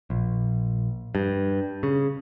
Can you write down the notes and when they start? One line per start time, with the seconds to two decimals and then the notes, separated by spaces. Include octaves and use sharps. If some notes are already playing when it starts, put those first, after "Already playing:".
0.10 A#1
1.15 G2
1.83 C#3